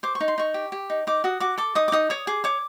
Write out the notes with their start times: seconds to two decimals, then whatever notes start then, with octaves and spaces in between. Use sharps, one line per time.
0.03 C5 D6
0.15 C#6
0.21 D#4
0.28 C6
0.38 D#4 C#6
0.54 G4
0.72 G4
0.90 D#4
1.07 D#4 D6
1.24 F#4 D#6
1.40 F#4 D6
1.58 A4 D6
1.75 D#4 D#6
1.88 D6
1.92 D#4 D#6
2.10 C#5 D#6
2.27 G#4 D6
2.44 C#5 D6